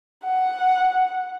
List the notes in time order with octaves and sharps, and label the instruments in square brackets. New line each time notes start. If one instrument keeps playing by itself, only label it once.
[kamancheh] F#5